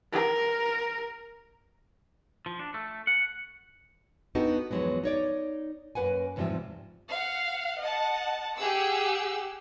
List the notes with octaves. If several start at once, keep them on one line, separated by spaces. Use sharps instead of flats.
A#4
F3
D4
A3
F#5
B3 D4 D#4 F#4 G4 A4
E2 G#2 F3 F#3 G#3 B3
D#4 C#5 D5
F#2 A#3 B4 F#5 G#5
E2 G#2 C3 F3 G3 E5
F5 F#5
D#5 F#5 A5
G4 G#4 F#5 E6